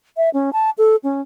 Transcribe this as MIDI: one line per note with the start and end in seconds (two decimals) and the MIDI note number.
0.17 0.30 76
0.34 0.53 61
0.53 0.70 81
0.78 0.96 69
1.04 1.21 61